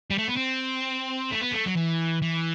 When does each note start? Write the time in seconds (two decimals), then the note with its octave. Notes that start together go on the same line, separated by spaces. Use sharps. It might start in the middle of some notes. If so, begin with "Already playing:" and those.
0.11 G3
0.18 A3
0.29 B3
0.37 C4
1.31 A3
1.41 B3
1.52 A3
1.66 F#3
1.76 E3
2.22 E3